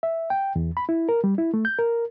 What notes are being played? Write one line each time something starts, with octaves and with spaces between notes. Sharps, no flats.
E5
G5
E2
B5
E4
A#4
G3
E4
A3
G6
A#4